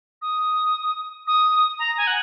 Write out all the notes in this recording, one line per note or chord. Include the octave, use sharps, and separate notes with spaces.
D#6
D#6
A#5
G#5
F#5